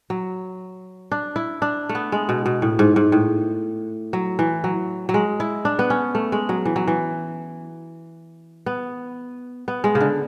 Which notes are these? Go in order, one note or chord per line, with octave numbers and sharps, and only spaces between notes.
F#3
D4
E4
D4
A3
B3
G#3
B2
B2
A2
G#2
G#2
A2
F#3
E3
F#3
F#3
G#3
E4
D4
B3
C#4
A3
G#3
F#3
E3
F#3
E3
B3
B3
G#3
C#3
D3